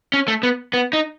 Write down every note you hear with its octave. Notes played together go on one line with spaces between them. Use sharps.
C#4
A3
B3
B3
D#4